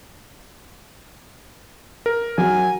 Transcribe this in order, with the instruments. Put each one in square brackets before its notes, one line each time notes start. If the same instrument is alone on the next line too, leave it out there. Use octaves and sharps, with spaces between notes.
[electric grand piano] A#4
[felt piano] F#3 [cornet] G#5